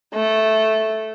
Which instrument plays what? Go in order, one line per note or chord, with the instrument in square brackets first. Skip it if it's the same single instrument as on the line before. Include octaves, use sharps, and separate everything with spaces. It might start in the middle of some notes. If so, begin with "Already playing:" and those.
[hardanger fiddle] A3